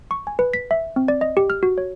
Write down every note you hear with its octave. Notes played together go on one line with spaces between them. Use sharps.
C#6
G#5
B4
B6
E5
C4
D5
D#5
G4
F6
F#4
C#5